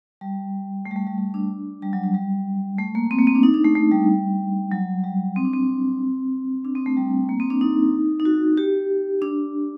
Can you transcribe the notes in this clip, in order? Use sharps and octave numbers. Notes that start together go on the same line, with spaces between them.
G3
A3
G3
A3
G3
G3
D4
G3
F#3
G3
G3
A3
A#3
C4
A#3
C4
D4
D#4
D4
A3
A3
G3
F#3
G3
C4
D4
C4
D4
C4
A3
G3
A#3
C4
D4
D#4
D#4
F#4
G4
D4